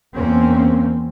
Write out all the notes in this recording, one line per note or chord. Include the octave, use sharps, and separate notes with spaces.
E2 A#3 C4 C#4